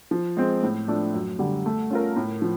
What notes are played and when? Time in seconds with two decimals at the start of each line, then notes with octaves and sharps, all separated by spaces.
0.11 F3
0.37 G#3 C4
0.63 A2
0.88 F3 A3 D4
1.14 F#2
1.39 D3 G3
1.66 A3
1.90 C#4 F4 A#4
2.16 A2
2.42 F3